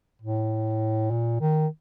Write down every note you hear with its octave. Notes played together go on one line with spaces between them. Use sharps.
A2
A#2
D#3